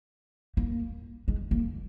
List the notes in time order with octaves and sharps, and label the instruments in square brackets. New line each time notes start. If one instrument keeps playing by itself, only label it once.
[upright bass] A#3
G#3
A#3